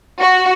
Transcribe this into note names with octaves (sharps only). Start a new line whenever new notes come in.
F#4